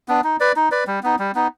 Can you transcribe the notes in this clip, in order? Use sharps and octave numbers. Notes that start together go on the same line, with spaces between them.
B3 D4
D#4
B4 D5
D#4
B4 D5
G3
B3 D#4
G3
B3 D#4